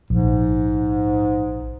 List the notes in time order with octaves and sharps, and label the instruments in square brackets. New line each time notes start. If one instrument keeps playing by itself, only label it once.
[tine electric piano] A#1 [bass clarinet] G#2